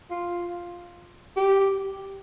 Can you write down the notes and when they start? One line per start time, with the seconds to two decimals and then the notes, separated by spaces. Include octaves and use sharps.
0.10 F4
1.36 G4